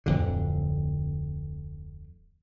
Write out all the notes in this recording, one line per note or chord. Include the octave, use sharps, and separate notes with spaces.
D1 F2 D3